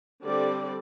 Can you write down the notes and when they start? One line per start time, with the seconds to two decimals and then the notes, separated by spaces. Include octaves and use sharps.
0.24 D3 G3 C4 G4 D5